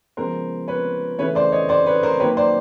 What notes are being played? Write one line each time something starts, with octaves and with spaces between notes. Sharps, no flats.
C#3 F3 G#3 B3 A#4 C5
B4 C#5
C#3 E3 A3 B4 C#5
C5 D5
C#5 D#5
C5 D5
B4 C#5
A#4 C5
D#3 F#3 A#3 B4 C#5
C5 D5